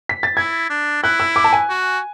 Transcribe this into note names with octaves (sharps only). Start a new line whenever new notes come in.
B6
A6
E4 G#6
D4
E4 F#6
E6
D6
A5
G#5
F#4